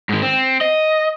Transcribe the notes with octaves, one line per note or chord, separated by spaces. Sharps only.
G#2 D#3
C4
D#5